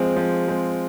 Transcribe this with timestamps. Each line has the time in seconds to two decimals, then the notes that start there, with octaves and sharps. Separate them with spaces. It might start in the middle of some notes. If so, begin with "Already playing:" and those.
Already playing: F3 G#3 C4
0.17 F3
0.48 G#3 C4